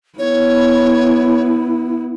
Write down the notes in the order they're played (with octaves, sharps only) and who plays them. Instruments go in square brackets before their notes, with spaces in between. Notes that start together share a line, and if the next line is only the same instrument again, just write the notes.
[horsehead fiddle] B3 E4 [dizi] C#5